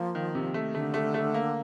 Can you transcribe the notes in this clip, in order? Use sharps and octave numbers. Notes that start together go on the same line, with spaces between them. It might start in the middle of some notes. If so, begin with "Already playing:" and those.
Already playing: F3 A#3
D#3
C3
A3
D3 A3
A3
A3
A#3